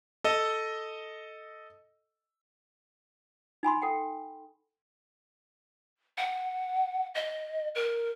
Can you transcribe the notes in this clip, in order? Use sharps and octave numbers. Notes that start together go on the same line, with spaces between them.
A4 D#5
D#4 G#5 B5 C6
A4 F#5 G5
F#5
D#5
A#4